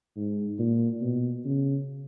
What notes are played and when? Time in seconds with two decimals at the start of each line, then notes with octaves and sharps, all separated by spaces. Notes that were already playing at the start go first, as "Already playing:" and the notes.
0.17 G#2
0.59 A#2
1.01 B2
1.45 C#3